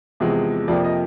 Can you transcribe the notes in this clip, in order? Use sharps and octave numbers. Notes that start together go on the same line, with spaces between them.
E2 C3 F3 G#3
F2 C3 F3 A#3 D5
D#5